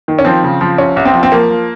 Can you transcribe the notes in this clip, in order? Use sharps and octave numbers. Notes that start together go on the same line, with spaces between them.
D#3
C#4
F3 C4
C#3
F3
C2 C#4
C2
C4
F3
C4
F3 A#3
F3